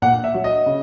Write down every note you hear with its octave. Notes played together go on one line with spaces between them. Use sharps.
A#2 F#5
E5
F#3
D#5
C#3